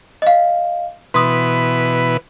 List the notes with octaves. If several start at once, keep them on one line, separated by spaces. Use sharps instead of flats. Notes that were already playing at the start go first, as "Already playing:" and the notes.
D#5 F5
B2 E3 B4 C6 D#6